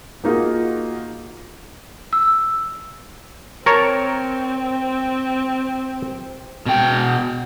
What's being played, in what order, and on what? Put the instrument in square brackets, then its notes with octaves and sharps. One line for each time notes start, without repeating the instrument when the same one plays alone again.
[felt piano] A#3 D#4 F4 F#4 G#4
[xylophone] E6
[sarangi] C4 [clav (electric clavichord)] A#4 C#5 A5
[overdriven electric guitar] B2 G5